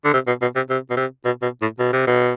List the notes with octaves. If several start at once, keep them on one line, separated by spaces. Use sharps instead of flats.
D3
C3
B2
B2
C3
C3
B2
C3
B2
B2
A2
B2
C3
B2